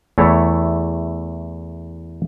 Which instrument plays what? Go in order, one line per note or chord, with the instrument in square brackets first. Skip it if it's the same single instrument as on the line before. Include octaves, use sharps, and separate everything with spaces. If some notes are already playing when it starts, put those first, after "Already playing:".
[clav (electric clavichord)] E2 A3 E4 C#5